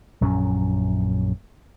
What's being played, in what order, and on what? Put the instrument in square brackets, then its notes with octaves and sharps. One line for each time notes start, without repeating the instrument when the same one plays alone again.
[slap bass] A#1 F#2 F#3 C#4